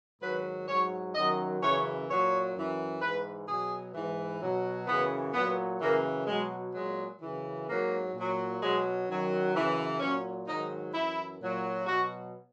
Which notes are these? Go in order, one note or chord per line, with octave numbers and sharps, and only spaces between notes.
G#2 D#3 F#3 B4
G#2 F#3 C#5
F#2 D#3 F#3 D#5
F#2 C#3 E3 C#5
A#2 F#3 C#5
F#2 E3
G#2 E3 B4
B2 F#3 G#4
G#2 E3
B2 F#3
F#2 C#3 E3 B3
A#2 F#3 B3
F#2 C#3 E3 A#3
B2 F#3 G#3
A#2 F#3 G#3
F#2 C#3 E3
G#2 F#3 A#3
A#2
F#3
B2 F#3 G#3
F#2 D#3 F#3
F#2 C#3 E3
A#2 F#3 C#4
G#2 D#3 F#3 D#4
F#2 E3 E4
A#2 F#3
B2 F#3 F#4